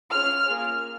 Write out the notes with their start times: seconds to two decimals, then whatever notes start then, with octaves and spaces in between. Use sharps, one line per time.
0.11 C#4 F4 G#4 F6
0.47 A#3 F4 G#4